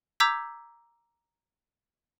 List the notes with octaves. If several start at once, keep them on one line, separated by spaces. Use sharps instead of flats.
A#5 D6 E6 G6 G#6 B6